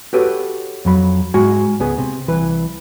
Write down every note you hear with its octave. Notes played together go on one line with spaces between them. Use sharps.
F#4 G4 A4 B4 C#5
F2 F#3 B5
G#2 G#3 F#4 G#5
C#2 B3 G#4
C3
C2 E3 B4